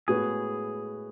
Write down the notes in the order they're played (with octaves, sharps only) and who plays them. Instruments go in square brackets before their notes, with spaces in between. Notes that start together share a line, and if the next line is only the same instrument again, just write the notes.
[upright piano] A2 G#3 B3 F#4 B4 [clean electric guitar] G#4